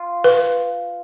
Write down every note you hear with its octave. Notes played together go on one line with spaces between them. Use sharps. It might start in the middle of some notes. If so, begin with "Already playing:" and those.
Already playing: F4
B4